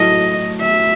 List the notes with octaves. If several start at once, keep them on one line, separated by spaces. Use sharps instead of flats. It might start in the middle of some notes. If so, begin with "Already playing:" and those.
Already playing: A2 F#3 A3 E4 D#5
E5